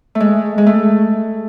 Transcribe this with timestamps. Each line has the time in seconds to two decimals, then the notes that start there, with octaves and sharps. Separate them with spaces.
0.15 A3
0.20 G#3
0.58 G#3
0.66 A3